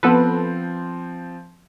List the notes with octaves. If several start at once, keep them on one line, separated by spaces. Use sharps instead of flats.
F3 B3 C4 A4 B4